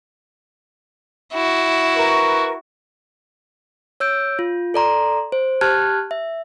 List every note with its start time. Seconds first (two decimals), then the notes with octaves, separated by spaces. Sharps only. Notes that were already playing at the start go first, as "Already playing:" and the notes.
1.33 E4 F#4
1.95 A#4 B4 C#6
4.00 C#5 E6 G6 D7
4.39 F4
4.74 A4 D5 A#5 C6
5.32 C5
5.61 G4 A5 F6 F#6 G#6
6.11 E5